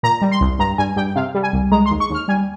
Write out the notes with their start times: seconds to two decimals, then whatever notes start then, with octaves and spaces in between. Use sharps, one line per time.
0.03 A#2 A#5
0.22 G3
0.32 C6
0.41 C2
0.59 G2 A#5
0.78 G2 G#5
0.96 G2 G5
1.16 C3 F5
1.35 G3
1.43 G#5
1.53 C2
1.72 G#3 A#5
1.86 C6
1.91 D#2
2.00 C#6
2.10 D#2 F6
2.28 G3 G#5